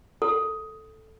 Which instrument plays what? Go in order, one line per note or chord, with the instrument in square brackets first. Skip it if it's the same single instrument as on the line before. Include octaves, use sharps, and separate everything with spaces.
[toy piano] A4